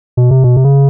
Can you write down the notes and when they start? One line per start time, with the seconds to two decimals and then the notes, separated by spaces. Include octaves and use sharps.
0.17 B2
0.31 C3
0.44 B2
0.56 C3
0.64 C#3